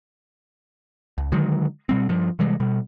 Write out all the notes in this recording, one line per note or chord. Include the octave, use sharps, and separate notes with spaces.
C#2
D3 D#3 F#3 G#3
B2 G3 C4
G2 F3
C3 E3 G3 G#3
B2 G3